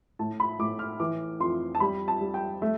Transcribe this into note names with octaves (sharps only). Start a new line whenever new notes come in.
A2 A5
B5
A2 D6
F6
E3 D6
F2 C6
A5
G3 B5
A5
G3
G5
A3 E5